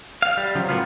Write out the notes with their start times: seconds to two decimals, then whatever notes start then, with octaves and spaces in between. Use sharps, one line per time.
0.22 F5
0.37 G3
0.55 C#3 F3 F#3
0.69 A2 A#3 B3 F4